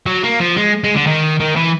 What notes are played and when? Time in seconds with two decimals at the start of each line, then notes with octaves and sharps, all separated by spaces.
0.06 F#3
0.24 A#3
0.40 F3
0.57 G#3
0.84 G#3
0.95 D3
1.07 D#3
1.40 D#3
1.56 E3